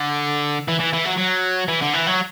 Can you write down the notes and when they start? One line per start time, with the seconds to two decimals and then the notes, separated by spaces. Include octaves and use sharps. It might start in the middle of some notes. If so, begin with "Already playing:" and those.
Already playing: D3
0.68 E3
0.80 E3
0.94 E3
1.06 F#3
1.18 F#3
1.68 E3
1.82 D3
1.93 E3
2.07 F#3